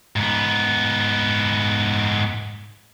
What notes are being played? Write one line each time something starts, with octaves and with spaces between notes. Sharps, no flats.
G#2 B3